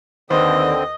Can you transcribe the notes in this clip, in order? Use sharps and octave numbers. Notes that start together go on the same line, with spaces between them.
D#2 D3 C4 B4 C5 D#5